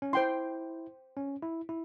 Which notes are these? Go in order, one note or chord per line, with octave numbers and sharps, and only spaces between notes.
C#4
E4 C5 G5 C6
C#4
E4
E4